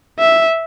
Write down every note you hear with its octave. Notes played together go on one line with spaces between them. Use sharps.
E5